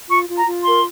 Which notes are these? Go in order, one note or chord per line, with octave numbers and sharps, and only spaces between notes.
F4 C#6
F4
A#5
F4
A#4 C6